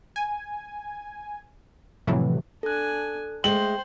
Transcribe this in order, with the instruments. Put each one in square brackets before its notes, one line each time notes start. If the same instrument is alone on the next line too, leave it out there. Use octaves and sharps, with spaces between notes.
[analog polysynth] G#5
F2 A2 C3 E3 F#3
[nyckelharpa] D4 G#5 [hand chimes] A4 F#6
[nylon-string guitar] G#3 A3 [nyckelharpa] C5 [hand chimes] G5 [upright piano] F#7